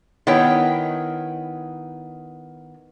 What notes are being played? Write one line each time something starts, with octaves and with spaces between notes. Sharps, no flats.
D#3 B3 E4 C#5 G5